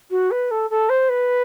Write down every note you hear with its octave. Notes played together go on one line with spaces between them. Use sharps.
F#4
B4
A4
A4
C5
B4